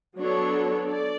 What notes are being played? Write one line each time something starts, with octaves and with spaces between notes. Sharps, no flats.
F#3 B3 D4 A4 C#5
D5